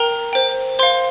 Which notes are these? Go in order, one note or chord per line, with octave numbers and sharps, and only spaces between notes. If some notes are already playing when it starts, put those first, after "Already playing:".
Already playing: A#4 G5 A#5
C5 G5
C5 F5 C6